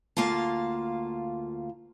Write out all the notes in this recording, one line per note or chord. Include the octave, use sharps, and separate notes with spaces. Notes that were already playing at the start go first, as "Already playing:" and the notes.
D2 A#3 F4 F5 A5